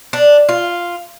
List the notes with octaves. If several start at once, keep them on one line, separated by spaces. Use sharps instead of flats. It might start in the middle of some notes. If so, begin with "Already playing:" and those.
D4
F4